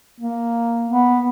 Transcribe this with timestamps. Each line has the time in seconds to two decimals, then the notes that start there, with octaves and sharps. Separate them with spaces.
0.21 A#3
0.89 B3